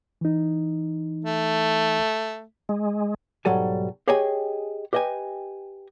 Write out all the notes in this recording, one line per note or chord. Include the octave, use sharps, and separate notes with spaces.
E3 D#4
A3
G#3
B1 G#2 F#3 G3 A4 G#5
G4 G#4 C#5 D#5 G5 G#5
G4 B4 D#5 G5 G#5